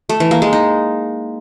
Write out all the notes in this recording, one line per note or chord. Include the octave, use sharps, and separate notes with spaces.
A3
E3
A#3
G#3
D#4